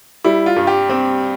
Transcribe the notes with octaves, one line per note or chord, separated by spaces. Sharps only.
G3 E4
F4
G2
G4
C4